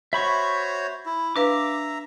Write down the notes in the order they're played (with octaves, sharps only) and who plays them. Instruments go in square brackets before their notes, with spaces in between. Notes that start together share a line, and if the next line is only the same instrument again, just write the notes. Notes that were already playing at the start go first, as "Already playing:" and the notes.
[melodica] F#4 C5 C#5 [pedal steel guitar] E5 B5 C#6
[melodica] E4
[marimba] D4 B4 F5 [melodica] E5 A#5 [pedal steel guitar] D6